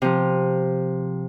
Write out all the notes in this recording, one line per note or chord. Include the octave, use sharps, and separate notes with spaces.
C3 F3